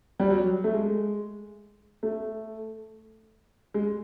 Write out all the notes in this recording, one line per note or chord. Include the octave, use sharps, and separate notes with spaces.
G3
F#3
A3
G#3
A3
G#3